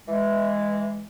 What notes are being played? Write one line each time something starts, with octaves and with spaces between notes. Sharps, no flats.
E3 G#3